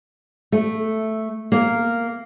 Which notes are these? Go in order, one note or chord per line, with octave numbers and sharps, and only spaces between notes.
A3
A#3